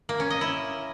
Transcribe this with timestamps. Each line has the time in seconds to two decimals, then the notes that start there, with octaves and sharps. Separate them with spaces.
0.09 A#3
0.20 C#4
0.30 D#5
0.41 E4